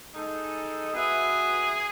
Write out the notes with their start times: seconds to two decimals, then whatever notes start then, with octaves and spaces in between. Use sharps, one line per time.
0.14 G#3 D#4 A4
0.93 B3 F#4 G#4 B4 E5